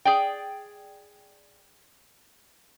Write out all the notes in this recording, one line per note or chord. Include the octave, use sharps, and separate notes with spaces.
G#4 D5 G5